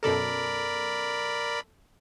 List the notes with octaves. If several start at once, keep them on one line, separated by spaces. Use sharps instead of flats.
F#2 B2 A4 A#4 D5 B5